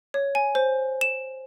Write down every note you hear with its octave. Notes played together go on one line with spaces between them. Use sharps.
C#5
G#5
C5
E7